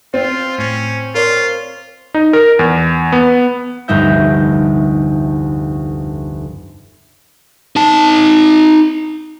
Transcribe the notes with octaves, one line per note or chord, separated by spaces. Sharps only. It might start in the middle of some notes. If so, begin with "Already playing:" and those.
C4 F4
A2 C#4
F4 A#4 C#5 D5
D#4
A#4
E2
B3
F1 D2 G2 D#4 E5 G6
D#4 A5